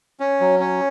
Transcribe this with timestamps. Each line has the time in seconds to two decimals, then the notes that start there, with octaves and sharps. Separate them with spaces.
0.20 C#4
0.40 F#3
0.60 C#4